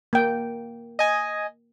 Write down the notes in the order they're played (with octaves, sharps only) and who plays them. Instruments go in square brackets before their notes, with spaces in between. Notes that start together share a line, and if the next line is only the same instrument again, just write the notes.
[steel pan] A#3 G5
[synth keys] D#5 G#5